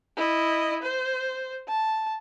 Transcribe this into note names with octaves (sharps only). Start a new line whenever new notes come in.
E4 D#5
C5
A5